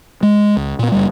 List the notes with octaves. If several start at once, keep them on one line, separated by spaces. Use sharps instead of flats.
G#3
C#2
A#2 B3
F#1 G3